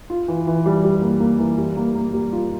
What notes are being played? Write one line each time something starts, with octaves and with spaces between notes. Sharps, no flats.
F4
E3
E3
G3
G3
A#3
A#3
E3
G3
A#3
A#3
G3
F4